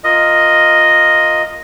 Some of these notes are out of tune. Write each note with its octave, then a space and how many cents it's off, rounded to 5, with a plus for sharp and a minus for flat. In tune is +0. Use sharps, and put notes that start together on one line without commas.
F4 +0 A#4 +0 D#5 +0